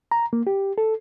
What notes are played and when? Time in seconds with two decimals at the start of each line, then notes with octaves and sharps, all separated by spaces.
0.12 A#5
0.33 A#3
0.47 G4
0.78 A4